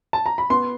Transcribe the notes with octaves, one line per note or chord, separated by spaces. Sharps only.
A5
A#5
B5
B3 C6